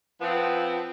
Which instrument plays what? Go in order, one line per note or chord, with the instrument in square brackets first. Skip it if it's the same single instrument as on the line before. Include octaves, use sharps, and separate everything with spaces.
[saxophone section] F3 B3 C4